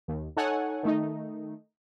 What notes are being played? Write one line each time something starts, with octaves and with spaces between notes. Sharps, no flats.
D#2
D#4 A4 C#5 F#5 G#5
D#3 A3 D#4